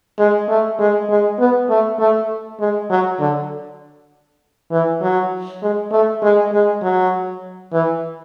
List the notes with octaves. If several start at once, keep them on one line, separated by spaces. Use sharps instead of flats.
G#3
A3
G#3
G#3
B3
A3
A3
G#3
F#3
D3
E3
F#3
G#3
A3
G#3
G#3
F#3
E3